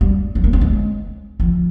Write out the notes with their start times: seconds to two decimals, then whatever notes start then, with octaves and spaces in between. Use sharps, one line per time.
0.01 G3
0.35 F3
0.44 A#3
0.53 C4
0.61 G#3
1.40 F3